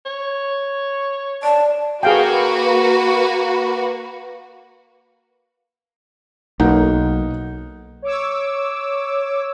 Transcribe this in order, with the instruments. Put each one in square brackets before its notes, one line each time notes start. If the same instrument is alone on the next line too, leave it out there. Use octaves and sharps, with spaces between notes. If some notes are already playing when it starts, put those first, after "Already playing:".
[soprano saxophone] C#5
[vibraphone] D5 [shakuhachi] A5
[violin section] A#3 F#4 B4 [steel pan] G#4 F5 G5
[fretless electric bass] B1 [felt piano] A#3 D#4 F#5
[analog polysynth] C#5 D6 E6